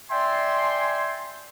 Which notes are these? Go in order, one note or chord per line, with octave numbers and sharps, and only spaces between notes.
D5 E5 G5 G#5 C6